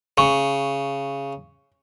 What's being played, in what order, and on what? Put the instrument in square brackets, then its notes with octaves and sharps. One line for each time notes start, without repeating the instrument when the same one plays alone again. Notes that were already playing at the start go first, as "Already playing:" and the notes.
[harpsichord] C#3 [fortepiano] C#6